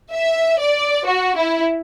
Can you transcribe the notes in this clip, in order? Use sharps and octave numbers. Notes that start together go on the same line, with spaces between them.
E5
D5
F#4
E4